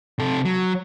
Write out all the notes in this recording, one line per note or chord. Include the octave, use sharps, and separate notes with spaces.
C3 A4
F#3